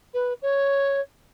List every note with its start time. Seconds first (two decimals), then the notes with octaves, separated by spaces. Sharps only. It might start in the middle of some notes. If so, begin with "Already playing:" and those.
0.14 B4
0.42 C#5